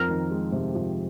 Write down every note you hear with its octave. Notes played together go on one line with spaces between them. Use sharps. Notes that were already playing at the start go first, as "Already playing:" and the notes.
Already playing: F2 C4 A#4
D#3
G#3
C3
F2